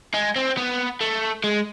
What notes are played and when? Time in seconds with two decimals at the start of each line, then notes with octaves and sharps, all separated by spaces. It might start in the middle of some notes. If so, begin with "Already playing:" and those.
0.14 G#3
0.36 C4
0.57 B3
1.01 A3
1.44 G#3